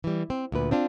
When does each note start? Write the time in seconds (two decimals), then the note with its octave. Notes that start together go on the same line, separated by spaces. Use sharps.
0.04 E3 G3
0.30 C4
0.52 D2 A#2 B4
0.71 C4 D4 F4